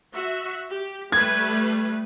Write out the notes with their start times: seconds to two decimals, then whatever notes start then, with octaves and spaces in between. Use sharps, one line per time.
0.14 F#4 E5
0.70 G4
1.12 G3 A3 B4 G#6